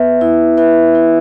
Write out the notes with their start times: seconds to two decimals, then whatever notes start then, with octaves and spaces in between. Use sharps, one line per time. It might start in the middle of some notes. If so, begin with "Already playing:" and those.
Already playing: B3 B4 E5
0.21 E4
0.57 E4 B4 E5
0.95 E4